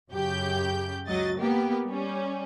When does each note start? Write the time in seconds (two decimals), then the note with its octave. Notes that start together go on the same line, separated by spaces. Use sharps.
0.11 F#2 C#3 G4 G6
1.08 C#2 F#3 D#5 A6
1.38 A#3 B3 G4
1.85 G3 C#4